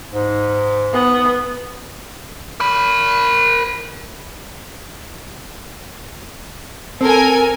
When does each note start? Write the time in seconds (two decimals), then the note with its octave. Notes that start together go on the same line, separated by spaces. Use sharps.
0.12 G#2
0.93 B3
2.60 A#4 B5
7.01 C4 A4 A#4 G#5